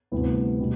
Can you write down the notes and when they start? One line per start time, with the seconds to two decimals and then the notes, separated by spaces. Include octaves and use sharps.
0.11 D2 C3 G3 B3 E4
0.60 B2 G3